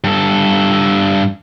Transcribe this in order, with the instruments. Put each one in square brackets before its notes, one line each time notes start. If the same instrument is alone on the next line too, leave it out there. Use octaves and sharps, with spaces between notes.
[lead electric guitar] G2 A4